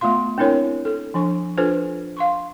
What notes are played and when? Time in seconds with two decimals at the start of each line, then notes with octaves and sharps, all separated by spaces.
0.01 A3 B3 F4 F5 C6
0.38 C4 D4 E4 A#4 C#5
0.85 A4
1.14 F3 D4 C#6
1.58 D4 F4 A4 B4 C5
2.17 F5 C6 C#6